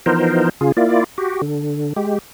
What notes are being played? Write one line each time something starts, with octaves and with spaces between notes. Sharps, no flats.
E3 F3 B3 D#4 A#4 C5
C#3 F4 G#4
A#3 E4 F4 D5
F#4 G4
D3
G#3 G4